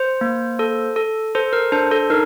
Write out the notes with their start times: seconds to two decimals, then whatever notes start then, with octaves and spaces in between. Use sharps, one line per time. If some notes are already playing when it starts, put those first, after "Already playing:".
Already playing: C5
0.21 A#3
0.59 A4
0.96 A4
1.35 A4 C5
1.53 A#4
1.72 D4 C5
1.91 A4
2.10 D#4 A#4